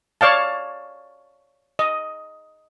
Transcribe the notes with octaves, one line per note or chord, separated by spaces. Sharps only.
C#5 D5 F5 A5
D#5